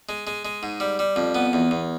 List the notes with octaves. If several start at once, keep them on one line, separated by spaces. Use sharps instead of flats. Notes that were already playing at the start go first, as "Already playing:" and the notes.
G#3
G#3
G#3
G#2
G3
G3
F2
B3
E2
E2